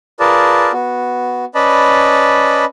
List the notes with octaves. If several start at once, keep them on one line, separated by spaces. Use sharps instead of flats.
F4 G#4 A#4 B4 D5 A5
B3 F#4
C#4 B4 D5 D#5 A5 B5